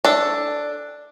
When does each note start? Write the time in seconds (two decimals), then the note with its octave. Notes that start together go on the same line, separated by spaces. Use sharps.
0.05 D4 A4